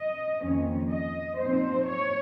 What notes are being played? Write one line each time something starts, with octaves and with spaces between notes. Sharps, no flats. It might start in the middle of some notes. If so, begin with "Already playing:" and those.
Already playing: D#5
F2 D#3 A#3 C#4
D#5
A#2 F3 C4 D#4 C5
C#5